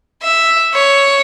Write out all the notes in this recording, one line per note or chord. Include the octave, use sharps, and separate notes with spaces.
E5
C#5